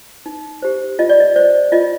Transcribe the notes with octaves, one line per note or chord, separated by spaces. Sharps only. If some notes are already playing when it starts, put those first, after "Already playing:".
D#4
G4 C5
F4 D#5
D5
D#5
C5 D5
F4 D#5